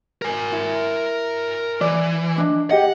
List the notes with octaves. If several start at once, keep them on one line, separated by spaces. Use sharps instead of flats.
A#4 G#5
E4
E3 D5
D4 D#5
G4 G#4 D#5 F#5